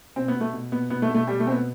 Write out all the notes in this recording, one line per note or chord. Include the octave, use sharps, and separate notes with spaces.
B2 C4
B3
B2
A3
B2
B2 B3
B2 B3
A3
B2
A3
B2 G3
A3
B2 C4
B3